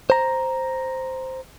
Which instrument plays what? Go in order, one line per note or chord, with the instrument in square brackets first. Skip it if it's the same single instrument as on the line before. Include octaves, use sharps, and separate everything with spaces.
[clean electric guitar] C5 A#5